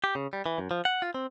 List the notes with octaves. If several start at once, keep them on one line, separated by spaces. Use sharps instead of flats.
G4
C#3
G3
E3
F#2
F3
F#5
F4
C4